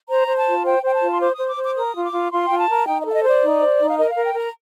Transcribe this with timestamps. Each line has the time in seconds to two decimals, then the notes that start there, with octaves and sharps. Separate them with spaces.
0.09 C5 A#5
0.28 C5
0.38 A5
0.47 F4
0.65 C5 G5
0.83 C5 G5
0.93 A5
1.02 F4
1.11 C6
1.20 C5 D6
1.34 C5 D#6
1.48 D6
1.57 C5
1.63 D6
1.76 A#4 D#6
1.94 F4
2.04 D6
2.12 F4
2.31 F4 C6
2.47 F4 G5
2.59 A5
2.68 A#4
2.86 D#4 G5
3.01 D#5
3.05 A4 F5
3.14 D#5
3.24 C5 D5
3.42 D#4
3.60 C5
3.80 D#4
3.89 F5
3.97 A#4 D#5
4.11 A#4 F5
4.25 G5
4.34 A#4 A#5